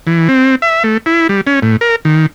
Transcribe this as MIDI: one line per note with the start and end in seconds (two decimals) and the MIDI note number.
0.07 0.28 52
0.29 0.55 60
0.62 0.83 76
0.84 0.97 57
1.06 1.27 64
1.29 1.41 55
1.47 1.60 61
1.62 1.77 45
1.81 1.96 70
2.05 2.26 51